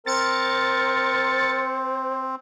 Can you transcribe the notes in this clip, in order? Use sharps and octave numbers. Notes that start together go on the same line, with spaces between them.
C4 A#4 C5 A6 C#7